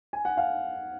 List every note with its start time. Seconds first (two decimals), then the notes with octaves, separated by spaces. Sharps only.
0.13 G#5
0.25 F#5
0.37 F5